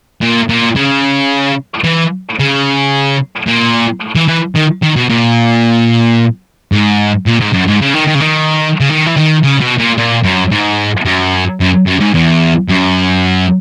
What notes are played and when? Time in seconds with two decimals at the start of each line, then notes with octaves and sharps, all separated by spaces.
0.22 A#2
0.49 A#2
0.76 C#3
1.84 E3
2.39 C#3
3.47 A#2
4.15 E3
4.28 E3
4.55 D#3
4.82 D#3
4.96 B2
5.10 A#2
6.72 G#2
7.26 A#2
7.40 G#2
7.53 F#2
7.67 G#2
7.81 C#3
7.94 D#3
8.07 D#3
8.15 C#3
8.21 D#3
8.80 C#3
8.89 D#3
9.06 E3
9.16 D#3
9.43 C#3
9.60 B2
9.78 A#2
9.97 A#2
10.24 F#2
10.52 G#2
11.05 F#2
11.60 F#2
11.86 F#2
12.00 G#2
12.14 E2
12.68 F#2